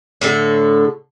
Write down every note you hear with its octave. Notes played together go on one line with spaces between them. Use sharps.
A2 D3 A4